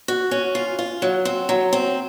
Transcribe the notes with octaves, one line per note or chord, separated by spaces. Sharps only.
F#4
C#4
F4
F4
F#3
C4
F#3
C4